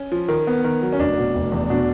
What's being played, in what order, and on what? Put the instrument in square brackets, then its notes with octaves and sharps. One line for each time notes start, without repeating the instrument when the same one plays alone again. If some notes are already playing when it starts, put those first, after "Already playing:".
Already playing: [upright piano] C#4
[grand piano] F3
D#3
B3
D#3
F#3
[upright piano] C#4
[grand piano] F1 [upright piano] D4
[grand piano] B2
F1
E2
[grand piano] B2 [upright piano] D4